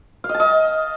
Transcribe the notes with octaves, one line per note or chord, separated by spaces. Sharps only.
F5
D#5
A5
D#5